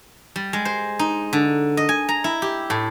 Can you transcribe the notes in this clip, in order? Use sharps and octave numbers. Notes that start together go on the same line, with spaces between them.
G3
G#3
C5
D#4
D3
D#5
G#5
A#5
E4
G4
A2